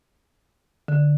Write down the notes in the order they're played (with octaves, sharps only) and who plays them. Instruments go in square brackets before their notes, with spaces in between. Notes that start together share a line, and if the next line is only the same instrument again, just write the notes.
[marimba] D3